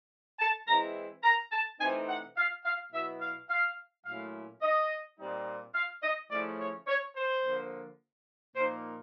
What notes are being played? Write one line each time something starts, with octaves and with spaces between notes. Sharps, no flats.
A5
E3 G#3 C4 E4 A#5
A#5
A5
C3 E3 A3 C4 D#4 G#5
F#5
F5
F5
B2 F#3 B3 E4 E5
F5
F5
A#2 F#3 A3 C#4 E4 F5
D#5
A#2 G3 C4 D#4
F5
D#5
C#3 F3 A3 C#4 E4 D5
C#5
C#5
C5
D3 F3 A#3
A#2 F3 A#3 D#4 C5